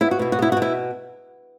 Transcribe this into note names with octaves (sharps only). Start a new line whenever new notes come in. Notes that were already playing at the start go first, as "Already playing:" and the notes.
B3 E4
F#4
B2 E4
F#4
B3 E4
F#4
B2
E4